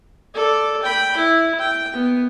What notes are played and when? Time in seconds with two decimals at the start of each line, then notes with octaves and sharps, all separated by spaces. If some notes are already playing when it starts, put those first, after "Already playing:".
0.34 A4 D5
0.83 G5 B5
1.17 E4
1.59 G5
1.93 B3